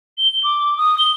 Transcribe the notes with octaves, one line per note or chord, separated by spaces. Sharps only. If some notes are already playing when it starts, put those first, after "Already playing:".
G7
D6
D#6
G7